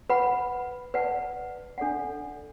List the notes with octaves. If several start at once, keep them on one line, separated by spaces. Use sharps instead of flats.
B4 F#5 B5
B4 D5 F#5 A5
D4 A4 D5 F#5